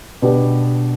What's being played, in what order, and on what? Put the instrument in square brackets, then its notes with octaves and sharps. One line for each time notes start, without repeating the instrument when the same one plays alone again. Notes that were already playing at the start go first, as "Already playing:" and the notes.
[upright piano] B2 B3 D4 G4